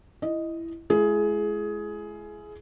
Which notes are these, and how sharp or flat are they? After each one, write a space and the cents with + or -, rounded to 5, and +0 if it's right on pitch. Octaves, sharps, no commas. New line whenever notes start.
E4 +10 D#5 +0
G#3 +35 E4 +40 G#4 +15